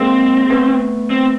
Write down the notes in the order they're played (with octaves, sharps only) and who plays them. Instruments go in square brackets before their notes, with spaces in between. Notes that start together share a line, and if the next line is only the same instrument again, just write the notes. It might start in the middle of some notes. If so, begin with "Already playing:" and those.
Already playing: [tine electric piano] G#3 A#3 [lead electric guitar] C4
[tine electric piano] A3 B3
[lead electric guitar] C4